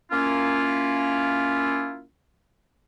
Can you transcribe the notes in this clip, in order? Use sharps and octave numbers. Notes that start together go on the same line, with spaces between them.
A#3 C#4 E4 F4